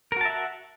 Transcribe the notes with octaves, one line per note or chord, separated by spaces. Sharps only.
F#4 A#4 E5 F#5 A5